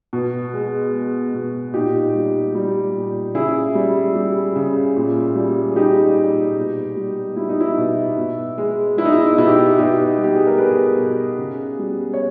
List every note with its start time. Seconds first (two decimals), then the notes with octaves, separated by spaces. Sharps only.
0.13 B2
0.54 G#3
0.94 G#3
1.34 B2
1.74 A#2 D#4 G4
2.15 G3
2.55 G3
2.95 A#2
3.35 C#3 E4 G#4
3.75 G3
4.15 G3
4.56 C#3
4.96 A#2
5.35 G3
5.70 G#4
5.76 G3 D#4 G4
6.17 A#2
6.56 B2
6.97 G3
7.36 G3 E4
7.49 D#4
7.60 E4
7.77 B2
8.18 B2
8.58 G#3
8.97 G#3 E4
9.05 D#4
9.13 E4
9.37 B2 E4
9.47 G4
9.55 E4
9.78 B2 D#4 G4
10.18 G3
10.24 G4
10.35 G#4
10.47 A#4
10.58 G3 G#4 B4
10.98 B2
11.38 C#3
11.79 G3
12.14 C#5